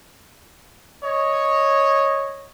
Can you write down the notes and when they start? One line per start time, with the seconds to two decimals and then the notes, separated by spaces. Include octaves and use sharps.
1.03 C#5 D#5